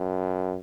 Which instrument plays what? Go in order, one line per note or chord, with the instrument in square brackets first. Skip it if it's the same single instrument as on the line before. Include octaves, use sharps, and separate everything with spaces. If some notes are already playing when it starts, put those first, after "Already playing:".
Already playing: [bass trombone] F#2